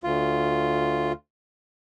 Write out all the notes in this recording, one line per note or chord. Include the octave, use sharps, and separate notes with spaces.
D2 F4